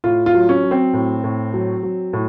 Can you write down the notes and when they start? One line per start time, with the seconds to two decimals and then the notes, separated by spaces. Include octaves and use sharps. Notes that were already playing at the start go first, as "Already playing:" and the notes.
0.04 A2 F4
0.26 F4
0.34 F#3
0.49 C#4
0.63 F#3
0.71 C4
0.94 A2
1.24 A2
1.53 F#3
1.83 F#3
2.13 A2